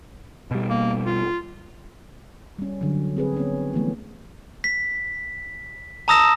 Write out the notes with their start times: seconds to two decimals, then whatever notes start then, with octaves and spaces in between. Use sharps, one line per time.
0.51 B2 G3
0.70 A#3
1.06 F4
2.59 G3 C#4
2.81 D3 F#3
3.17 C4 G#4 B4
3.37 B3 C#4
3.73 E3 F3 G#3 A3 B3
4.64 B6
6.08 A5 A#5 D#6 E6 A#6 E7